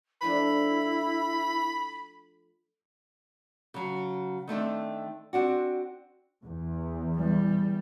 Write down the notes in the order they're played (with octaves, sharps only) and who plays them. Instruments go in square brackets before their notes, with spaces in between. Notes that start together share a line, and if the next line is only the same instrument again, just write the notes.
[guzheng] F3 A3 D4 [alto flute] E4 [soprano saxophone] B5
[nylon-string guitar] C#3 F#3
D#3 A3 C4 D4
C4 D4 F#4
[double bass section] E2
[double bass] G3